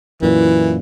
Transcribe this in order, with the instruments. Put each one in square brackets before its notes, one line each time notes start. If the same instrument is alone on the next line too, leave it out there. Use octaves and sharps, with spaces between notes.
[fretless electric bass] F#2 A#2 [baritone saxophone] E3